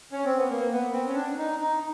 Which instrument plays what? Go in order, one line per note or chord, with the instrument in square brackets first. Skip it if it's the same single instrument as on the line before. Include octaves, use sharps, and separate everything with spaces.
[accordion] C#4
C4
B3
A#3
B3
C4
C#4
D4
D#4
D#4